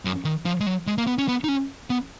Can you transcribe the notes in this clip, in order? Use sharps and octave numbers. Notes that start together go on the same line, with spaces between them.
F#2
D#3
F3
G#3
F#3
G#3
A#3
B3
C#4
B3
D#4
C#4
B3